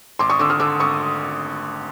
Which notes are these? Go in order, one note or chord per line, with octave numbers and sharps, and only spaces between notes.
G#1 C6 D6
C#6 D#6
D3 D6 E6
D#6 F6
D3 D6 E6
G#1 C#6 D#6